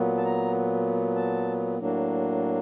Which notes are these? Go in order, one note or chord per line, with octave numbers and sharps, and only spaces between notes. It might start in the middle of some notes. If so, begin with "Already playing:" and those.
Already playing: A#2 F#3 B3
A5
A#5
A5
A2 F#3 A#3 D4